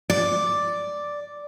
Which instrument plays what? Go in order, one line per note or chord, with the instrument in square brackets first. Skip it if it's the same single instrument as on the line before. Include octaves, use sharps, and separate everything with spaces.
[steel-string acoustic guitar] D5